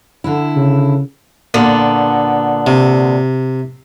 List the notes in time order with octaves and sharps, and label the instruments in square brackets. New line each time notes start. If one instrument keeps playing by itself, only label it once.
[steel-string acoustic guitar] D3 E4
[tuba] C#3
[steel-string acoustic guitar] A#2 D3 B3
[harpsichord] C3